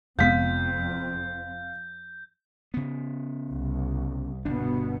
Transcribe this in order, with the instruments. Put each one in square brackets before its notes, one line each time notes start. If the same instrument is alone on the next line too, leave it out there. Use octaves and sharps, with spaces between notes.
[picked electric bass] F1 G#3 B3 [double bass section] F2 C4 [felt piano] F5 B6 [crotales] G6
[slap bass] C#3 B3
[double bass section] C2
[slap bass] G1 D4 [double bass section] B2 B3